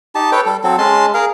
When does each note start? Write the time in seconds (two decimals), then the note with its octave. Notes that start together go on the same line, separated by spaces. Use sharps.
0.15 D#4 G4 A5
0.32 A4 B4 C#5 G5
0.46 G3 A4
0.64 F#3 C4 A4
0.78 G#3 C#4 A5 C6
1.14 G#4 A#4 F5